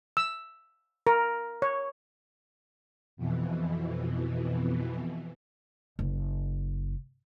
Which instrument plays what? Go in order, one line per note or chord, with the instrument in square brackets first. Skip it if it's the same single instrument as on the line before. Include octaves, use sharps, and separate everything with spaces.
[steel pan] E6
A#4
C#5
[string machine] F2 B2 E3
[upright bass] F#1